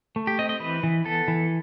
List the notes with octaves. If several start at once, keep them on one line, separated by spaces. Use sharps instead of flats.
A3
G4
C4 D#5
D#5
E3 B4
E3
B3 A4
E3